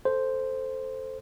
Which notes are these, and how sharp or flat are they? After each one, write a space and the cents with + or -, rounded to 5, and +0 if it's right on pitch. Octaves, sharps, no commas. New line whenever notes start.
A4 +0 C5 +0